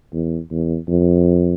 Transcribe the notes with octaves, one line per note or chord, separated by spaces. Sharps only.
E2
E2
F2